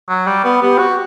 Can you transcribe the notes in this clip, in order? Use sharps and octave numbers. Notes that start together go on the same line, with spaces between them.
F#3
G3
B3
B3 G4
F#4